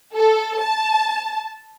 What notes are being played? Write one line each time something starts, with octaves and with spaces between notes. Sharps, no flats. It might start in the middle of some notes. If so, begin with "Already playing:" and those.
A4
A5